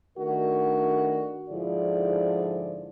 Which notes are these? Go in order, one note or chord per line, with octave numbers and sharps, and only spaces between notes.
D#3 A3 D4 F#4 A#4
G#2 D3 F3 E4 G#4 D5